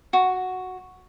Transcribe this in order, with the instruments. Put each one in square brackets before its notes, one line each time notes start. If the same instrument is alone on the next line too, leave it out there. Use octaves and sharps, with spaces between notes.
[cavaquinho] F#4